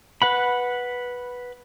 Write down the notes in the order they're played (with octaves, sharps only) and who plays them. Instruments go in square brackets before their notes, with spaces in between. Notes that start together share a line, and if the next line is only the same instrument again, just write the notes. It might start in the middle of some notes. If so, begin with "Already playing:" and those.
[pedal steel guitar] B4 F#5 B5